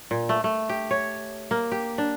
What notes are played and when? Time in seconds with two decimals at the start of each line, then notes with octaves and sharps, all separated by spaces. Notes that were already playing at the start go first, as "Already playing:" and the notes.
0.11 A#2
0.29 A3
0.44 A3
0.69 G4
0.91 C#5
1.51 A#3
1.72 G4
1.98 D4